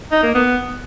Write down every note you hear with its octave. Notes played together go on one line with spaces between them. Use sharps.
D#4
A#3
B3